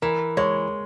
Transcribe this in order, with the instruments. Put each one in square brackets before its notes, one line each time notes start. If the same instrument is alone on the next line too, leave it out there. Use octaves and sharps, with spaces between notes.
[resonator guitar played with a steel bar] E3 [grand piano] A#4
[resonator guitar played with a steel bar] G#3 [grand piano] C#5